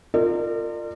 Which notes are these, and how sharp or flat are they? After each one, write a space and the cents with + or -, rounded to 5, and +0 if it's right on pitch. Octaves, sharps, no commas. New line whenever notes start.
F4 +0 A#4 -35 D5 +35